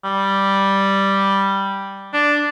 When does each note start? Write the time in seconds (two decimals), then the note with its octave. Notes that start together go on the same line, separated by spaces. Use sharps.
0.04 G3
2.14 D4